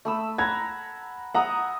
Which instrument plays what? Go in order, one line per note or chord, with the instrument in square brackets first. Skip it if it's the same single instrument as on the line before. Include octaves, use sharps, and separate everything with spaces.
[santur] A3 B5 E6
[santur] F#5 A#5 B5 [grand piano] G#6
[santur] E5 D#6 [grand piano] F#5 A#5